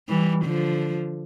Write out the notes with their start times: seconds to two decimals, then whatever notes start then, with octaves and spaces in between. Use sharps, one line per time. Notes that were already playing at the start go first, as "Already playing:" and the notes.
0.08 E3 G3
0.44 D3 F3